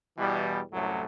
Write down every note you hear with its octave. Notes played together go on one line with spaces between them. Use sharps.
E2 B2 E3 G3
C2 F#2 A2 F#3 A3